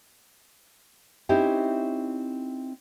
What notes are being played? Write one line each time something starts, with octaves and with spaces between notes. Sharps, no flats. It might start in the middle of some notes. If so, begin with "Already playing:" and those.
C4 C#4 D#4 E4 G4